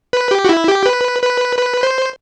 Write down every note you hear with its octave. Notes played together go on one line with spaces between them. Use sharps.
B4
G4
F#4
E4
G4
B4
B4
B4
C5